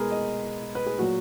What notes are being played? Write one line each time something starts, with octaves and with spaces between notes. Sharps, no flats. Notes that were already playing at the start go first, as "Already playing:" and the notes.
Already playing: B2 G#3 G#4 A#4 B4
D#5
B4
G#4
A#2 F#3 F#4